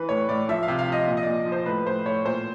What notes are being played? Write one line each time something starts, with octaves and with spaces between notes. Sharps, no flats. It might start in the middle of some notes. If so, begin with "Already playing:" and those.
Already playing: E3 B4
A2 C#5
A2 D5
F3 E5
F5
C3
F5
F3 D#5
A#2
D#5
A#2 D5
F3
C5
A2 B4
A2 C5
A2 C#5
A#2 C5